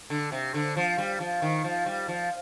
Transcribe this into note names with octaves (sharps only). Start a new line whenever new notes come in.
D3
C3
D3
F3
G3
F3
D#3
F3
G3
F3